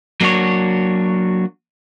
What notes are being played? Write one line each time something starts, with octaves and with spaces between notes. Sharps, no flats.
F#3 A#3 D4 F#4 C#5